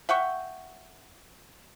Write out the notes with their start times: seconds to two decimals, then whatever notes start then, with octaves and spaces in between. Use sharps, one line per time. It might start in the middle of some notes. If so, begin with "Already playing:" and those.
0.09 E5 F#5 G5 C#6